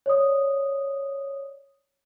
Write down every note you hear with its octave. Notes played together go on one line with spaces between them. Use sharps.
C#5 D5 D#6